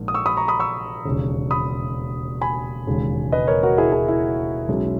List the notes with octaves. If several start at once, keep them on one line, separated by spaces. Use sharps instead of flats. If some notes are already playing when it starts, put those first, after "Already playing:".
Already playing: A#1 G#2 A#3
D#6
C#6 E6
B5 D#6
A#5 C#6
B5 D#6
C#6 E6
E1 D#2 C#3
B5 D#6
G#5 B5
E1 D#2 C#3 G#3
B4 D#5
A#4 C#5
F#4 A#4
E4 G#4
E4 G#4
E4
B1 B2 G#3 C#4